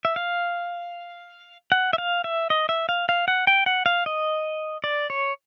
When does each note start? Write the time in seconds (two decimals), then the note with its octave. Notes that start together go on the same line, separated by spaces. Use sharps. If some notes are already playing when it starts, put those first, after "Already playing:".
0.05 E5
0.16 F5
1.72 F#5
1.93 E5
1.98 F5
2.24 E5
2.50 D#5
2.69 E5
2.89 F5
3.09 F5
3.28 F#5
3.47 G5
3.66 F#5
3.86 F5
4.06 D#5
4.84 D5
5.10 C#5